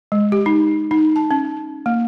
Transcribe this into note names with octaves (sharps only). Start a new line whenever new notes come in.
G#3
G4
D#4
D#4
A5
C#4
A#3